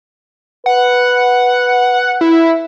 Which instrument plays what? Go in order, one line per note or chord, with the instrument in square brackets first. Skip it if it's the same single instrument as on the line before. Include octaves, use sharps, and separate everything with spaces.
[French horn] B4 [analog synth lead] F#5
[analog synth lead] E4